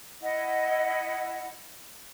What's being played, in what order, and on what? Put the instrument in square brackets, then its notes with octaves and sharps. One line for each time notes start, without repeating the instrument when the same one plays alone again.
[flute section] E4 D#5 F#5